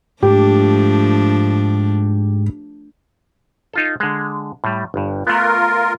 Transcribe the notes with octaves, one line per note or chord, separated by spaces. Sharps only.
G#2 F3 A3 D4 G4
D#4 F4 A4
D3 G#3
A2 G3
G1 G2
A3 B3 F4 A#4